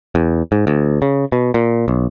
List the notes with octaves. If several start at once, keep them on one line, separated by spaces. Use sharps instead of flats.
E2
G#2
D2
C#3
B2
A#2
B1